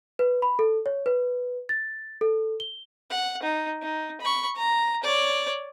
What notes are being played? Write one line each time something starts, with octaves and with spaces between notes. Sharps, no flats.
B4
B5
A4
C#5
B4
A6
A4
G7
F#5
D#4
D#4
B5 C#6
A#5
C#5 D5